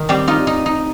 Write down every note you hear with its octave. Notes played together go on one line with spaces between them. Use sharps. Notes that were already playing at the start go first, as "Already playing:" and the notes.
Already playing: D#3 D#4
G3 C4 G4
D#4 F4
D#4
D#4